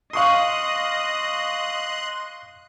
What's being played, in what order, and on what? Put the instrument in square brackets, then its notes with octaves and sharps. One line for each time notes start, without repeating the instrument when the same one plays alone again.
[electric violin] D#5 [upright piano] F5 C#6 D#6 [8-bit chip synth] C6 F#6